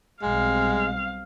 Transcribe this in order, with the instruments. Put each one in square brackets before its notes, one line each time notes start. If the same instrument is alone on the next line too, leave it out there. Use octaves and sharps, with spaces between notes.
[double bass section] B1 G3 C4 [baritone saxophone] G#3 [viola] F5